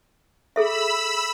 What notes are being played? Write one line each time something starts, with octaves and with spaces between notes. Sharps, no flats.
G#4 A4 E5 B5 E6